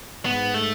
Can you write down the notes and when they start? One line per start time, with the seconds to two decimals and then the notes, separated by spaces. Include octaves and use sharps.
0.25 G#2 B3
0.54 A3